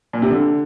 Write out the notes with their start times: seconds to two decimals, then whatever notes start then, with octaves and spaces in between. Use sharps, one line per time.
0.13 A#2
0.22 C3
0.31 D3